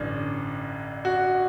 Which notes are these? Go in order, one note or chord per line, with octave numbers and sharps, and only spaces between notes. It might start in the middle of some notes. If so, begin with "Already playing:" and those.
Already playing: A1 G2 D3
F#4